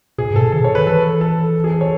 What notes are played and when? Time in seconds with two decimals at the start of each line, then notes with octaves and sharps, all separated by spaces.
0.18 B2 G#4
0.30 G#2
0.36 A4
0.41 B2
0.52 D#3 A4
0.65 C#5
0.75 B4
0.87 E3 A4
1.21 A4
1.64 G#4
1.73 A4
1.81 C#5